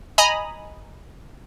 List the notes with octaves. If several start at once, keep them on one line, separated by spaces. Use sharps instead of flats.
D#5 G#5 A#5 B5 D#6